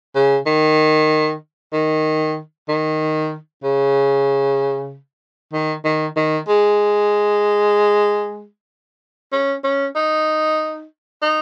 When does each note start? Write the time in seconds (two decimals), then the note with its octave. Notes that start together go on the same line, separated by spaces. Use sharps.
0.15 C#3
0.46 D#3
1.73 D#3
2.68 D#3
3.64 C#3
5.53 D#3
5.85 D#3
6.16 D#3
6.48 G#3
9.32 C#4
9.64 C#4
9.96 D#4
11.22 D#4